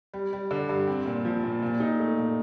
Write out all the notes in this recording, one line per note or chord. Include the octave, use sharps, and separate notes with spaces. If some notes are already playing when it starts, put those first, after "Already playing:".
G3
G3
D3
G2
C4
A#2
F3
A#2
A#2
D#4
A3
A#2